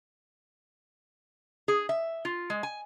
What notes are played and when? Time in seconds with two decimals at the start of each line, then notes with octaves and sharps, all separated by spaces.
1.68 G#4
1.89 E5
2.25 F4
2.50 G#3
2.63 G#5